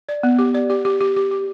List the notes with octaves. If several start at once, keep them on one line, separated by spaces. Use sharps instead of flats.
D5
B3
G4
D5
G4
G4
G4
G4
G4